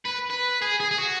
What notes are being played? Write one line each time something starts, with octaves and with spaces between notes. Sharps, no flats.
B4
B4
G#4
G#4
G#4
F#4